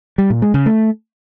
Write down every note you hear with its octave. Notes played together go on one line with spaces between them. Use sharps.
G3
A#2
G#3
C#3
A3